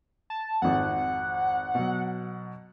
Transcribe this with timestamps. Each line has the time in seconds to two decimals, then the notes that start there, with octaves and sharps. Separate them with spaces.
0.30 A5
0.62 G#1 F2 F#5
1.75 B2 F#3